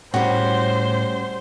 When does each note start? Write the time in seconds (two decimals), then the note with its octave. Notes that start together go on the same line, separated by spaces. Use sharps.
0.14 A2 G3 C#4 F#4 C5